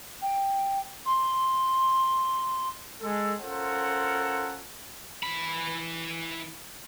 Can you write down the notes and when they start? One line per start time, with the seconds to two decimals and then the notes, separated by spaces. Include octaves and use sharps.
0.21 G5
1.05 C6
3.02 G#3 A4
3.40 C#4 F4 A4 A#4 C5 F#5
5.23 E3 B5